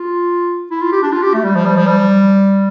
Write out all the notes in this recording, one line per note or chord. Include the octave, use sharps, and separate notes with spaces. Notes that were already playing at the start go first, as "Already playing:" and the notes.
Already playing: F4
E4
F4
G4
D4
F4
G4
A3
G3
F3
G3
F3
G3